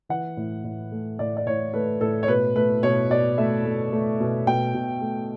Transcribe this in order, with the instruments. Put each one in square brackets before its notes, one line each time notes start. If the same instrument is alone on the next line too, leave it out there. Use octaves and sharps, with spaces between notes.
[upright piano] E3 F#5
A2
A2
A3
A2 D5
D5
A2 C#5
A3 B4
A2 A4
C#5
B2 B4
A3 B4
B2 C#5
B2 D5
A3 E5
A3
A3
B2
B2 G5
B2
A3